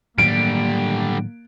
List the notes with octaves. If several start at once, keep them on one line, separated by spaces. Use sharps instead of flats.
A2 D3 D#3 F#3 G3 A#3 D7